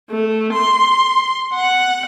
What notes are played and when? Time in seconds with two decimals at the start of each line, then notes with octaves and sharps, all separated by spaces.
0.10 A3
0.53 C6
1.54 F#5